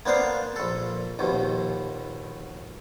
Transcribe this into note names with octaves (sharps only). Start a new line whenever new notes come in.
A#3 B3 D4 C5 D5 F5
A#1 A4
A#1 D#2 B2